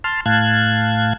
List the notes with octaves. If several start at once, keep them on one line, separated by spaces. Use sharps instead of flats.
A5 C6 F6
A2 F5 A5 F#6 G#6